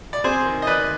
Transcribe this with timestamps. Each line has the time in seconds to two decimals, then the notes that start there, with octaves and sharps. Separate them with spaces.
0.13 D5
0.24 C4 G#4 C5
0.46 D#3
0.62 D#5
0.67 D#3 B4 D5